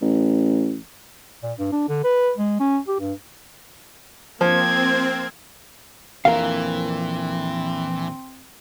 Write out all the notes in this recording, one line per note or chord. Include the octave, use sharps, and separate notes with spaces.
A1
A#2
G2
D4
D3
B4
G#3
C#4
G4
G2
F3 A#3 C4 G#6
A#1 F2 A#2 E3 C4 A#4 F5